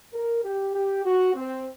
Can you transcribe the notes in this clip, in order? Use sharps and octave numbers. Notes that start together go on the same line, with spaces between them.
A#4
G4
G4
F#4
C4